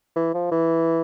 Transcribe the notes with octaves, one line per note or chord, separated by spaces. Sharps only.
E3
F3
E3